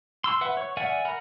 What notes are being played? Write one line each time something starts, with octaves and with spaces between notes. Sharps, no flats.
C6 E6
B4 E5 F#5
C#5
A#4 D5 E5 F#5 G#5
A#4 F#5 B5